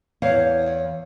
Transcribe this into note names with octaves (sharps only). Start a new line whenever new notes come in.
E2 C#5 F5